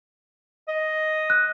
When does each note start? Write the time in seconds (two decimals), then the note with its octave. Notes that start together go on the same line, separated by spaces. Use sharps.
0.68 D#5
1.30 F#6